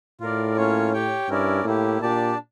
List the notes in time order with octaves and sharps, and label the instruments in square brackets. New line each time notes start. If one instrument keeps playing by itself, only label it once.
[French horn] A2 [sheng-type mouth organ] F4 A#4 D5
[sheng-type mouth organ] A#3 C#4 F4 C#5
G4 C#5 G5
[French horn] G2 [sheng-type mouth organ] C#4 E4 A#4 D5
[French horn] A2 [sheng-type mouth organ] A#3 E4 G4
[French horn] A#2 [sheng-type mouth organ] D4 G4 D5 A5